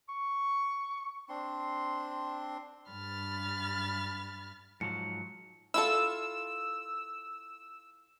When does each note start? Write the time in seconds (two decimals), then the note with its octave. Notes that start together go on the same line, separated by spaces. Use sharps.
0.09 C#6
1.29 C4 D4 C6
2.91 G2 B5 F6 A6
4.81 G#2 F3 F#3 C#7
5.74 E4 F4 A4 E6